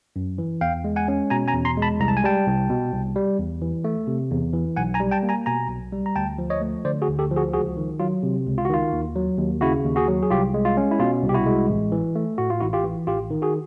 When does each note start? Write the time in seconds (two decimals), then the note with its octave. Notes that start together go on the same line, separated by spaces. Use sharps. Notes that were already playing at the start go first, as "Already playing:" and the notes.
0.16 F#2
0.38 E3
0.61 E2 F5 G5
0.84 G#3
0.96 F#5 G#5
1.08 C#4
1.30 B2 G#5 A#5
1.48 G#5 A#5
1.53 E2
1.65 A#5 C6
1.77 G#3 A5 B5
2.00 C2 A#5
2.08 A5
2.17 G#5
2.24 G3 G5 A5
2.46 C2
2.70 B2
2.93 C2
3.16 G3
3.38 E2
3.62 E3
3.84 A3
4.07 C3
4.31 E2
4.53 E3
4.76 B1 F#5 G#5
4.94 G#5 A#5
5.00 G3
5.11 G5 A5
5.23 A#3
5.29 G#5 A#5
5.46 B2 G#5 A#5
5.69 B1
5.92 G3
6.06 A#5
6.16 D2 G5 A5
6.38 F3
6.50 C#5 D#5
6.61 A3
6.84 D3 C5 D5
7.02 F#4 G#4
7.08 D2
7.19 G4 A4
7.31 F3
7.36 F#4 G#4
7.53 C#2 F#4 G#4
7.77 D#3
8.00 F#3 F4
8.23 C3
8.46 C#2
8.58 F4
8.65 F#4
8.69 D#3 F4
8.93 D#2
9.16 F#3
9.38 D#2
9.61 C#3 E4 F#4
9.84 D#2
9.96 F#4 G#4
10.08 F#3
10.23 G#4
10.30 C2 F4 G4
10.54 G#3
10.65 F4
10.77 C#4
10.91 E4
11.00 B2 F4
11.23 C2
11.29 G4
11.34 E4 F#4
11.46 G#3
11.69 A1
11.92 E3
12.15 A3
12.38 A2 F#4
12.50 F4
12.60 A1 E4 F#4
12.73 F4 G4
12.84 E3
13.07 A1 F4 G4
13.31 D#3
13.42 F#4 G#4